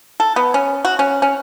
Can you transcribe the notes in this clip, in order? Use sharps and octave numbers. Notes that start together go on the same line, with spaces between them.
A4
B3
C#4
F#4
C#4
C#4